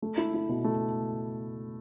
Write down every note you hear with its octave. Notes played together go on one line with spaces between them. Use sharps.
A3
E4
E4
B2
A3